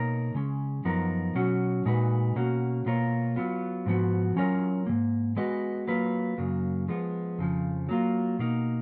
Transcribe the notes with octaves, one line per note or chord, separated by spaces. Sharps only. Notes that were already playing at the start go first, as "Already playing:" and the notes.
Already playing: B2 A#3 D#4 A#4 C#5
C#3 G#3 C#4
F#2 F3 B3 D#4 A#4
B2 F#3 C#4 F#4
A#2 G#3 D#4 F#4 B4
B2 A#3 C#4 F#4
B2 A#3 F4 A#4 C#5
F#3 B3 F4
G#2 F3 B3 F#4
F#3 C#4 F4 A#4 C#5
G#2 D#3 A#3
G#3 B3 F#4 B4 D#5
F#3 A#3 F4 B4
F#2 C#3 F#3 A#3
F3 G#3 B3
F2 C#3 F3
F#3 A#3 F4
B2 A#3 D#4